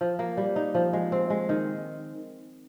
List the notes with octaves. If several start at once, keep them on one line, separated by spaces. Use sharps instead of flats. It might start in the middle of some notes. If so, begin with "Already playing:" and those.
F3
A#3
G3
D#4
F3
G#3
C4
G#3
D#3